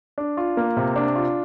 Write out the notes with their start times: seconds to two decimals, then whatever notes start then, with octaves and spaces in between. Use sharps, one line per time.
0.18 D4
0.37 F4
0.57 A#3
0.77 C3
0.96 D4
1.15 F4